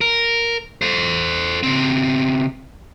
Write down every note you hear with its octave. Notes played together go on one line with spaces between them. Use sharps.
A#4
A4 C5
C#3 C4